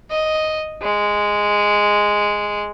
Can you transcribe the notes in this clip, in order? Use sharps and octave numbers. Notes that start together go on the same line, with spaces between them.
D#5
G#3